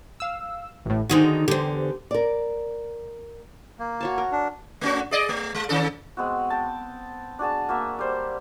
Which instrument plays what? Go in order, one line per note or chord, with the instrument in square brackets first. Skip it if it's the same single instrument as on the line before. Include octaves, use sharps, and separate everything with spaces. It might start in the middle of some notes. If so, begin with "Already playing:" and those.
[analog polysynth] F5 E6
A1 A2
[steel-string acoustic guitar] D3 D#3 D#4 [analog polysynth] F#4 G#4 C5
[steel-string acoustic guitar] E2 D3 [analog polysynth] G4 C5
[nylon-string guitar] A#4 D5
[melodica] A#3
[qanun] F#4 C#5 A5
A#4
[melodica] D4
[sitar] A3 C#4 F#4
G#4 D5 D#5
A3
G#3
D#3 C#4 A4
[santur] G#3 B3 C4 F#4
G5 A5
D4 F#4 G#4 A5
A#3 F#4 E5
G3 C5